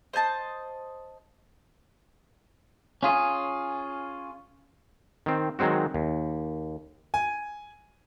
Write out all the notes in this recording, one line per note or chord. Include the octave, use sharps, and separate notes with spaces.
C5 D#5 G#5 A5
C#4 F4 G#4
D#3 C4
D#3 F#3 G#3 C4 F#4
D#2
G#5